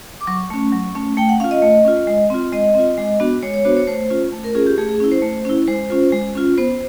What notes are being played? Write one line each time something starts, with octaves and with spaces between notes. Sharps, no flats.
D6
F#3 C#6
A3 C#4
F#3
A3 C#4
A3 G5
F#5
C#4 F4 F5
D#5
A3
C#4 F4
G#3
C4 F4
G#3 D#5
C4 F4
G#3
B3 D4 F#4
G#3 C#5
C#5
B3 D4 F#4 C5
C#5
A3 C5
C#4 F4
A3
A#4
C#4 F4 G#4
G4
A3 G#4
G#4
C#4 E4
C5
A3
C#4 E4
G#3 C5
C#4 F4
G#3
C#4 F4
B3 C5